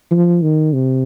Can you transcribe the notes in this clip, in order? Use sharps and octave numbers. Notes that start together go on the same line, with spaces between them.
F3
D#3
C3